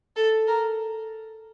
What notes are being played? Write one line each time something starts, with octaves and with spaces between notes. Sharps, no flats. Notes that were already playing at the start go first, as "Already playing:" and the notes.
A4
A#4